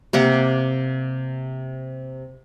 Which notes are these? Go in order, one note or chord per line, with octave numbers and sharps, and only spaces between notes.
C3 A#3 G4 F#5